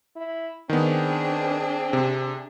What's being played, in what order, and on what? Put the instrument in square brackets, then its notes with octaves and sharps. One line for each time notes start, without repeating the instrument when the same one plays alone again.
[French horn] E4
[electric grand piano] D#3 B3 [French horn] C4 [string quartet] D4 G#4
[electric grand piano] C3